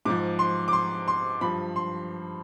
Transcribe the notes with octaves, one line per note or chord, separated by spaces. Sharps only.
G#2 F3 D6
C6
D6
C6
C6
G2 F3 B5
C6